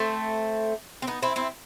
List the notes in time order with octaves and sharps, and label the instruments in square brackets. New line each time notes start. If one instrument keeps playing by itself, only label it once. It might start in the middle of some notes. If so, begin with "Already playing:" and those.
Already playing: [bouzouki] A3 C4
C4
B3 D#4
C4 E4
C4 E4